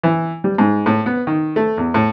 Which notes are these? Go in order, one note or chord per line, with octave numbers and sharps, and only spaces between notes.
E3
G3
G#2
A2
B3
D#3
A3
E2
A2